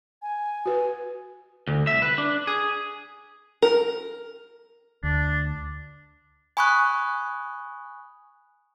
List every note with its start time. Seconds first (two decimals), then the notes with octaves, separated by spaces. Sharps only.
0.22 G#5
0.66 F#4 B4
1.68 D2
1.87 C2 E5
2.02 B4
2.18 D4
2.47 G#4
3.62 A#4
5.03 D2 D4
6.57 G#5 B5 C#6 D#6 F#6